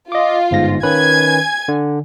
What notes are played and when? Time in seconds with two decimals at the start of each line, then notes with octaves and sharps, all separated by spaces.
0.12 F4 D#5 D6
0.51 G1 G#2 A#6
0.83 D#3 C#4 B4 G#5 G#6
1.68 D3